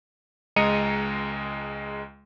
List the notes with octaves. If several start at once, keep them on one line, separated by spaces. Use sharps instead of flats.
C#2 G#3 D#5 A#5 C#7 D#7